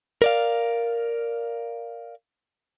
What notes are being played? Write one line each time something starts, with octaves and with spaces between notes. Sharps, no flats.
A#4 D5 F5